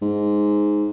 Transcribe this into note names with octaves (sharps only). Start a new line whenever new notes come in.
G#2